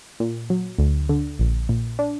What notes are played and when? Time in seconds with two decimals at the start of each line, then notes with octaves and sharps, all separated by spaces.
0.20 A#2
0.50 F#3
0.79 D2
1.09 D3
1.39 A#1
1.69 A#2
1.99 D4